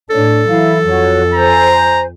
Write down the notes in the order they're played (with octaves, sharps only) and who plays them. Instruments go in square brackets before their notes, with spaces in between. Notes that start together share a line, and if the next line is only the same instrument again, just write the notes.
[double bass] A2 D4 [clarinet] A4 [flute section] C#5
[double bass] E3 F#3 [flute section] E4 F5
[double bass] F2 [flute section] F#4 C#5
[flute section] C5 G#5 G6 [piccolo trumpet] A#5